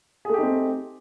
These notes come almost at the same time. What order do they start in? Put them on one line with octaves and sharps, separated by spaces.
G#4 A3 G4 D#4 C4